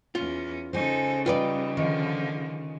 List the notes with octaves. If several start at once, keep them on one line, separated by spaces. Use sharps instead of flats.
E2 C#4 F4
C#3 G#3 D#4 A4 C5 G#5
G3 D#4 F4 B4 D5 G5
D3 D#3 F3